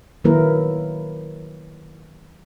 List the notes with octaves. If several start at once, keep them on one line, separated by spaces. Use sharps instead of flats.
D#3 F#3 A#3 E4 A#4 B4